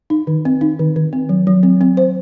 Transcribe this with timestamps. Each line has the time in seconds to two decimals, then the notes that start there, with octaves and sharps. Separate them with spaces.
0.10 D#4
0.27 D#3
0.45 C4
0.61 D#4
0.79 D#3
0.96 D#3
1.13 C4
1.29 F#3
1.47 F#3
1.63 C4
1.81 C4
1.97 C5